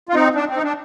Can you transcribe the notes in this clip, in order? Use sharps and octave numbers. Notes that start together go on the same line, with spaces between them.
F4
C4 D#4
D4
C4
D#4
D4